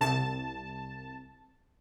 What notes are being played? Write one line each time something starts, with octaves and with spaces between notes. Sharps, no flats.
C2 A5